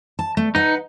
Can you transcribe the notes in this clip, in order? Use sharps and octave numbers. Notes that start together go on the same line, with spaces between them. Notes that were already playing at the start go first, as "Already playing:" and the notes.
A5
A3
D#4 B4 F#5